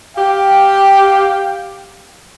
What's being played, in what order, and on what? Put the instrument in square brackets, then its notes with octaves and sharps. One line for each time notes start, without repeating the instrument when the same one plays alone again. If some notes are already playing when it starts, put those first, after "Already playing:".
[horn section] G4 F5 G5